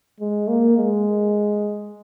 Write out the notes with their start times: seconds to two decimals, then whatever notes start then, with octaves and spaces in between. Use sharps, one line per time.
0.20 G#3
0.48 A#3
0.78 G#3